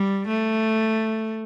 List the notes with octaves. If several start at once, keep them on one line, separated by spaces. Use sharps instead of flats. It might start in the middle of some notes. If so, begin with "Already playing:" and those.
Already playing: G3
A3